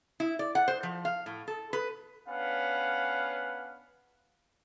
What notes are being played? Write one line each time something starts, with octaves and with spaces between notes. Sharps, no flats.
E4
D5
F#5
C5
F3
F5
A2
A4
B4
B3 C#4 D4 B4 F5 F#5